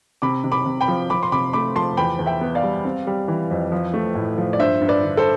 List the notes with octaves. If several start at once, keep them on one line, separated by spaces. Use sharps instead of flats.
C3 B5 D6
C3
B5 D6
C3
G5 B5
F3
F3 B5 D6
C6
C3 B5 D6
A3 B5 D6
F3 A5 C6
E2 G5 B5
E2
E5 G5
B3
D5 F5
G3
C4
G3
E3
F2
F3
A3
A2
F3
D5
G2 C5 E5
G2
B4 D5
D3
A4 C5